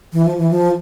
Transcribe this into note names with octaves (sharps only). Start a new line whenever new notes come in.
E3
F3
E3
F3